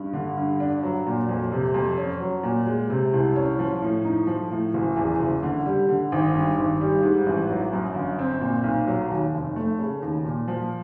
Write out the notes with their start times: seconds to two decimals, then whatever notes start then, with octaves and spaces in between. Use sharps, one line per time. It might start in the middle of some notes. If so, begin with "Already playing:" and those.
Already playing: G2
0.13 D3
0.37 G2
0.60 D4
0.83 F#3
1.06 A#2
1.29 F2
1.52 C3
1.74 F2
1.98 C#4
2.20 F#3
2.43 A#2
2.67 G#3
2.90 C3
3.13 C2
3.36 C#4
3.59 F3
3.82 A2
4.05 D#4
4.27 F3
4.50 A2
4.74 F#1
4.96 E2
5.20 F#1
5.43 D3
5.66 G3
5.89 D3
6.12 G#1
6.35 G2
6.58 G#1
6.81 G3
7.03 G#2
7.26 A1
7.49 F#3
7.73 F#2
7.95 G1
8.19 C4
8.41 A#2
8.64 B1
8.87 F#3
9.10 D#2
9.34 F1
9.56 A3
9.79 C#3
10.02 D#2
10.25 A#2
10.48 F3